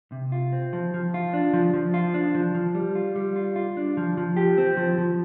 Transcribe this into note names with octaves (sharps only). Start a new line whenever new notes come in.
C3
F4
C4
F3
F3
F4
D4
F3
F3
F4
D4
F3
F3
G3
F4
G3
F4
F4
D4
F3
F3
G4
C4
F3
F3